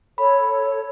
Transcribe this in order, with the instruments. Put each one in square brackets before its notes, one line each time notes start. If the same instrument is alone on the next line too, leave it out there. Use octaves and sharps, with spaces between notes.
[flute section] A4 C#5 [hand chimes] B5